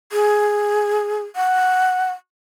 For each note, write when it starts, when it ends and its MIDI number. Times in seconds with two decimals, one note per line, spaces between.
0.12 1.24 68
1.36 2.11 78